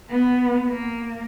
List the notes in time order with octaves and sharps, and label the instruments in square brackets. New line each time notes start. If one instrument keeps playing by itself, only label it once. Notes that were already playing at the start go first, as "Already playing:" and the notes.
[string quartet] B3
A#3